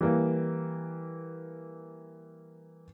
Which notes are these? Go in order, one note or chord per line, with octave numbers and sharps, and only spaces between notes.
E3 G3 A#3